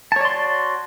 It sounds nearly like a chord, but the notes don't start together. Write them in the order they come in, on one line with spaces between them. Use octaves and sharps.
A5 C#5 D5 C6 F#4